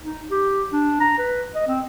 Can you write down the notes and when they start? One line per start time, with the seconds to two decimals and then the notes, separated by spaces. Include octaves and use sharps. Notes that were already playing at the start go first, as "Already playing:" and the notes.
0.03 D#4
0.31 G4
0.73 D4
1.01 A#5
1.18 B4
1.55 D#5
1.68 C4